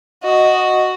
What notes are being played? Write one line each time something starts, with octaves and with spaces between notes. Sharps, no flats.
F#4 D#5